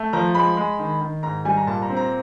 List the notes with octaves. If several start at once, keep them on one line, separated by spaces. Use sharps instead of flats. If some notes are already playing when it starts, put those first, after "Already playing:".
Already playing: A3
F3 A#5
G#3 B5
G#3
D#3
D#3
G#2 A#5
G3 G#5
A#5
A#2 A5
A#5
C4
A#5